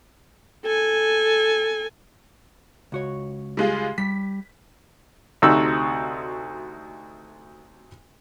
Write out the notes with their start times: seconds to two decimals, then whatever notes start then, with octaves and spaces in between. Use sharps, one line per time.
0.64 A4 G#5
2.92 C#2 F#4 C#5
3.57 G3 G#3 F4
3.98 G3 B6
5.42 D2 C3 D#4 F#4 E6